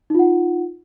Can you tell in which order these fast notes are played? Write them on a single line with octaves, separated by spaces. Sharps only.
D#4 F4 F#5